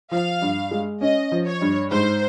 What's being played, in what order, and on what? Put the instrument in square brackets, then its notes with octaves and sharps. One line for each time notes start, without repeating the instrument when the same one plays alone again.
[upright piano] F3 [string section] F5
[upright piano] G2
G#3
[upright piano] C#4 [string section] D#5
[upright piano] F3
[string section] C#5
[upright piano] G2
[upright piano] G#2 [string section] C5